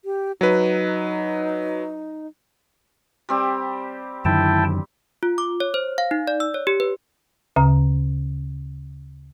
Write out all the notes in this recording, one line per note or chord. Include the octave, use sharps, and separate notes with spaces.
G4
F#3 D#4 B4
G3 C4 G4
F#2 D3 D#3 E4 G5 A5
F4
D6
C#5
C5
F5
D#4
D5
E6
C#5
G4
B4
D2 C#3 A#5